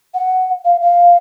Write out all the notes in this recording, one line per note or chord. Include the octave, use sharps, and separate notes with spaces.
F#5
F5
F5